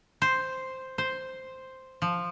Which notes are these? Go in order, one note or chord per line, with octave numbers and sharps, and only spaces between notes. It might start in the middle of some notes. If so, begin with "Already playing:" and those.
C5
C5
F3